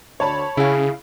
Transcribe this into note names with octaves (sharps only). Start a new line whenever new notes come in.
D2 D3 C#5 A5 B5
C#3 E4 G#4 F5